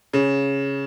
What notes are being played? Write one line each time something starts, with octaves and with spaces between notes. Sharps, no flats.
C#3